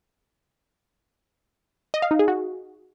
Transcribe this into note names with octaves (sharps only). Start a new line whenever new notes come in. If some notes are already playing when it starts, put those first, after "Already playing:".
D#5
F5
D#4
G#4
F#4